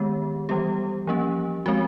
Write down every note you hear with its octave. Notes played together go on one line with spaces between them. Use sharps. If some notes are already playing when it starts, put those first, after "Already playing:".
Already playing: D#3 G#3 B3 G4
E3 G3 B3 G4
F3 A#3 C#4
F3 G#3 C4 F#4